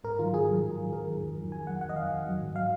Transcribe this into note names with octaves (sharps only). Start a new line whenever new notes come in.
G#2 A#4
D#3 F#3 F4
G#2 G#4
D#3 F#3
G#2
D#3 F#3
G#2 A#4
D#3 F#3
F2
D#3 F#3
F2 G#5
D#3 F#3 F#5
F2 F#5
D#5
D#3 F#3 F5
F2
D#3 F#3
G#2
F#3 F5